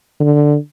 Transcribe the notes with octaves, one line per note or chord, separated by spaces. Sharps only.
D3